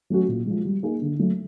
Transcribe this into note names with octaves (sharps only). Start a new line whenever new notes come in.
F#3 A3 C#4 F#4
A#2
F3 G#3
G3
A#3 D#4 G#4
D3
F#3 A3